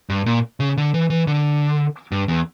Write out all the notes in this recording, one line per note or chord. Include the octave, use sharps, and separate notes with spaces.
G2
A#2
C#3
D3
E3
E3
D3
G2
E2